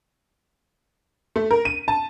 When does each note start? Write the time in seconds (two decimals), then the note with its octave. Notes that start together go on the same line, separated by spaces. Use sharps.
1.36 A3
1.51 A#4
1.65 D#7
1.88 A5